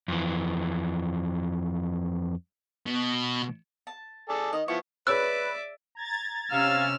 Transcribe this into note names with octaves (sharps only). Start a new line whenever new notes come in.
F2 E3
B2
A5
G#4 A4 D5
D#3 D#5
F3 B3 E4 C#6
G#4 B4 C#5 D5 E5 E6 F#6
A#5 G#6 A6
C3 C#4 F5 E6 F6